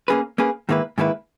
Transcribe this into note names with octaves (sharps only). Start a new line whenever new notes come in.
A#3 C#4 G#4 B4
A#3 C#4 G#4 B4
G#2 D#3 A#3 E4 B4
G#2 D#3 A#3 E4 B4